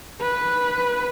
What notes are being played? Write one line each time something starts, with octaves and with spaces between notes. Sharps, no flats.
B4